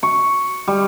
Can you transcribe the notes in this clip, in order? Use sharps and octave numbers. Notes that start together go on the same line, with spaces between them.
C#6
G3